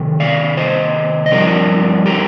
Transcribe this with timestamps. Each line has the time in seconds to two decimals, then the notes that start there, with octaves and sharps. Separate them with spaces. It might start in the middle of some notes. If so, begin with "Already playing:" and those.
Already playing: C3 D#3
0.20 D5 F5
0.57 C5 D#5
1.26 D#5
1.31 G2 F3 C4 A#4 D5
2.06 G4 A#4